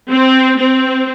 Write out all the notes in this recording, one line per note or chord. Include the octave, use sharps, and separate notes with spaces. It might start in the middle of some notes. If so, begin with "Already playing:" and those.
C4
C4